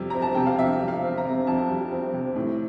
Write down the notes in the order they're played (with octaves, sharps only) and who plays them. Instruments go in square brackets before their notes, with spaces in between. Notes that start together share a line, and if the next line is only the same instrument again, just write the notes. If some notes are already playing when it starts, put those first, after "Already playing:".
Already playing: [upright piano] F2 C3 G3
C4 A#5
A5
C3 G5
F5
F2 E5
G3
F5
C4
A#5
C3
F2 A5
G3
C4
C3
A2